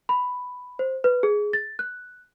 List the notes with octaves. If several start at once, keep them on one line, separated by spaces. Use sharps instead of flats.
B5
C5
B4
G#4
A6
F#6